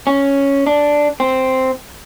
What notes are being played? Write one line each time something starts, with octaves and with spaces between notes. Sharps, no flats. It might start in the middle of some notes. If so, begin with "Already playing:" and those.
C#4
D4
C4